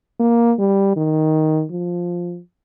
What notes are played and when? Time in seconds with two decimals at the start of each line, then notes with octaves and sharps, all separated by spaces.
0.20 A#3
0.59 G3
0.96 D#3
1.71 F3